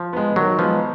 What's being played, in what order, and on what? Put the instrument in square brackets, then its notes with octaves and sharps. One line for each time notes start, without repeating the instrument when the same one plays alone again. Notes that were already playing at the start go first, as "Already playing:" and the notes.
Already playing: [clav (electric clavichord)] F3
[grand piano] G#3 B3
[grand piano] D#3 [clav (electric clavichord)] F#3
[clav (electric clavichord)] F3 [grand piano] G#3 B3